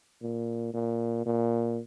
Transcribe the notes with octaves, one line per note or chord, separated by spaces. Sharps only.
A#2
A#2
A#2